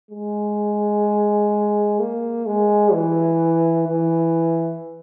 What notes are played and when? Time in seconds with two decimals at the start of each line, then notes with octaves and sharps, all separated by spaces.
0.10 G#3
1.99 A#3
2.46 G#3
2.93 E3
3.88 E3